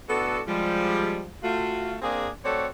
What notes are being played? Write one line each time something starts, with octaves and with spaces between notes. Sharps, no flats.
A2 B3 D4 F#4 A4
F3 G3 G#3
A3 F4 F#4
A#3 C4 D4 G#4
A3 C4 F#4 A4 C#5 D5